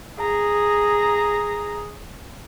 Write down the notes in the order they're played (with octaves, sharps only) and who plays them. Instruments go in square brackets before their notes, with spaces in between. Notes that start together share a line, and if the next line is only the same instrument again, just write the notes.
[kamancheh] G#4 A#5